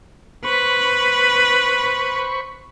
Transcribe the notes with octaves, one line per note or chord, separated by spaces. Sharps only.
B4 C5 B5 C#6